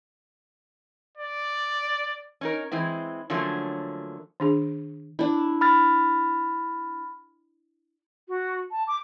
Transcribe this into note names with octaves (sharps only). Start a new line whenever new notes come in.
D5
C#4 D#4 A#4
E3 G#3 C4 E4
D3 F3 F#3 A3 A#3 C#4
D#3 D4 G#4
D4 E4
B5 F6 A6
F#4
A5
D6